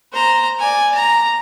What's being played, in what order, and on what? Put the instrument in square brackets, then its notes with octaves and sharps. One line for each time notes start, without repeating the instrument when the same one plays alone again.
[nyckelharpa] C5 A#5
D5 G#5
A#5